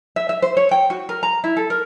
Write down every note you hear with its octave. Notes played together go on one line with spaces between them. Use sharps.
E5
E5
C5
C#5
G5
F#4
A#4
A#5
E4
A4
A#4